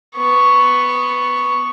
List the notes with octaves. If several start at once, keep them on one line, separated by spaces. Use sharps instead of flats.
B3 C#6